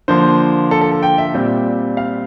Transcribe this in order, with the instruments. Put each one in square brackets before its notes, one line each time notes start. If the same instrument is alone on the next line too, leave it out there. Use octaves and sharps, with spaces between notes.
[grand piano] D3 F3 A#3 C5
A4
A4
A4
G5
E5
A#2 G3 C4
F5